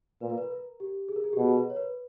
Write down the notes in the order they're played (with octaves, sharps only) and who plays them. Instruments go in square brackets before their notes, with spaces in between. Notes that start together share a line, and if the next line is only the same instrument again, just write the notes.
[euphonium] A#2 [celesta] B4
[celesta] A#4
B4
A#4
G4
G#4
A#4
G#4
G4
[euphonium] B2 [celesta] G#4
[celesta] B4
A#4
C#5
B4